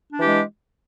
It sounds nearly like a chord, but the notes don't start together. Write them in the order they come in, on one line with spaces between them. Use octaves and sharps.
D4 E3 G4 G#3